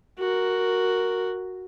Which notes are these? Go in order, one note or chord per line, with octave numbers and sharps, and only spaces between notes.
F#4 A#4